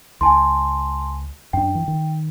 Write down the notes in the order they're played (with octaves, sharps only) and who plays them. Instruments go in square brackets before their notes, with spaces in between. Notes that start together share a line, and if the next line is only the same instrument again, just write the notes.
[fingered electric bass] C#2 [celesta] G#5 A5 C6
[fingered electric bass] F#2 D4 [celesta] G5
[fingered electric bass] E3
D#3